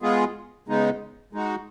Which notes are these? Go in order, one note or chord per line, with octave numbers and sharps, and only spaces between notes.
G#3 B3 F4 G#4
C#3 G#3 B3 D#4
G#3 D#4 F#4